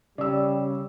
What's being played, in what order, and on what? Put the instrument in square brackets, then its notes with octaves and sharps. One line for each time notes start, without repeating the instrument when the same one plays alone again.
[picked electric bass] C#3 [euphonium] G3 [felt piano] D5 E6